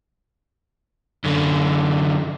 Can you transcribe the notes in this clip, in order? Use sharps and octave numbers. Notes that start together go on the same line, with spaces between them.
F#2 D3